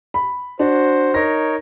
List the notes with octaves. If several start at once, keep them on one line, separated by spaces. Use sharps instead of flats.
B5
D4 F#4 C5
D#4 A#4 C#5 A#6